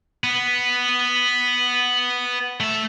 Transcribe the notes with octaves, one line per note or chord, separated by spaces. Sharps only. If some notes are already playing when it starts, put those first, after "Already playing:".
B3
A3 E5